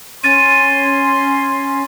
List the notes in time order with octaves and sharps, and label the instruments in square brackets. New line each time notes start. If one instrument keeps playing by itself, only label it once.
[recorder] C#4 [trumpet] C6 [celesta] A6 D#7